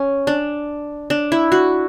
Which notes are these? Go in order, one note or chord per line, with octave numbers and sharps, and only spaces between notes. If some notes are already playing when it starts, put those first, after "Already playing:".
Already playing: C#4
D4
D4
E4
F#4